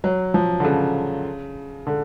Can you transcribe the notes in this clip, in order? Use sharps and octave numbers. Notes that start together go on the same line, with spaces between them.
F#3
F3
D3
C#3
D3